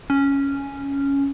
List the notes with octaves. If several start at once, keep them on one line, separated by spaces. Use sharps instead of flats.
C#4